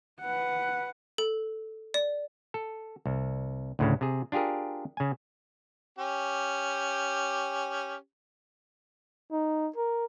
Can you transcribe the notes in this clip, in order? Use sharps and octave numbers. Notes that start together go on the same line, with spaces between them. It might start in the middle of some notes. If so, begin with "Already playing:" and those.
B4 F#5
A4
D5
A4
C2
D2 A2 C#3
C3 G#4
D4 F4 G4 G#4 A#4
C#3 G#5
C#4 G4
D#4
A#4